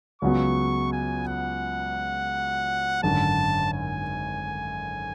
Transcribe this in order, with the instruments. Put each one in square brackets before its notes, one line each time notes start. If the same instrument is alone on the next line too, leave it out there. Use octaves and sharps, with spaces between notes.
[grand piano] C#2 C#3 F#3 B3 F#4 [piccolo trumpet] C#6
[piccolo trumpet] G#5
F#5
[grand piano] G#1 F#2 D3 [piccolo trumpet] A5
[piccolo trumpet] G#5